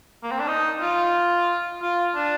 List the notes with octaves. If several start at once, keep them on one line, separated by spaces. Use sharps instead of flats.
A#3
C4
D4
D#4
F4
F4
D4